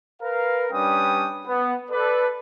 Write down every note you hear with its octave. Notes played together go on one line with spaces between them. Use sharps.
A#4 B4 F5
G3 C#4 D4 B4 G5 D#6
B3
A4 B4 D5